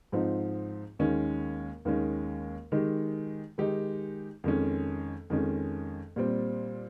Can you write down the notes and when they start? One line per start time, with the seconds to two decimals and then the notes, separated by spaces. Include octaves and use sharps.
0.12 G#2 F3 C4 D#4
0.99 D#2 D#3 G#3 C#4
1.85 D#2 D#3 G#3 C#4
2.72 D#3 G#3 D#4 G4
3.58 D#3 G#3 D#4 G4
4.44 F2 D#3 G#3 C#4
5.30 F2 D#3 G#3 C#4
6.16 A#2 G3 C4